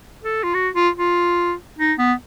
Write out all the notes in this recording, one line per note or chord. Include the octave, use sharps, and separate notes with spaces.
A4
F4
F#4
F4
F4
D#4
B3